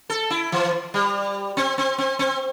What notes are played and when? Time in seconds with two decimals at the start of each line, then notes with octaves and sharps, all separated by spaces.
0.10 A4
0.30 E4
0.52 E3
0.94 G3
1.57 C4
1.78 C4
1.98 C4
2.19 C4